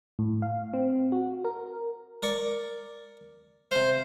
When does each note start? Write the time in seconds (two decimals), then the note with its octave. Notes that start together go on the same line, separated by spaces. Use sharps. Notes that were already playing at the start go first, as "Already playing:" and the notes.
0.19 A2
0.42 F5
0.73 C4
1.12 F#4
1.44 A#4
2.23 A#4 D5 C#6
3.71 C3 C5 F5